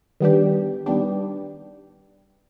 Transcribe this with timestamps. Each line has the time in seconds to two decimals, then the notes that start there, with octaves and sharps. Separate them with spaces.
0.20 D#3 G3 B3 D4 G4
0.86 D#3 G3 B3 D4 G4